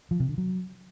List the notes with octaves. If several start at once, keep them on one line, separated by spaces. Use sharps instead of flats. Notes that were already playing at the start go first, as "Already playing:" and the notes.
F3
C3
D3
F#3